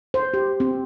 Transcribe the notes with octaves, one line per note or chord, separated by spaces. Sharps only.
C5
G4
C4